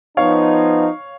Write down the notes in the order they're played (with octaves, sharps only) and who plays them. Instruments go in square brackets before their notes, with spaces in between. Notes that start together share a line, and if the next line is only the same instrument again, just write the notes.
[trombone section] F3 B3 D#4 [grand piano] C#5 F5